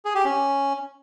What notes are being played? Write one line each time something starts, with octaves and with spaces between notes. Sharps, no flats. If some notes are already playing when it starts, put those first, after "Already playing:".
G#4
G4
C#4